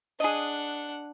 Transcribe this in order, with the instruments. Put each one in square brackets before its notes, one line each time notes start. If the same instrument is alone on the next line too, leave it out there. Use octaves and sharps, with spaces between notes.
[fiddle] D4 F#5 [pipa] G#4 D#5